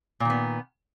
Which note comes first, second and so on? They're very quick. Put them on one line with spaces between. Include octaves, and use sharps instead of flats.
A#2 D#3 B3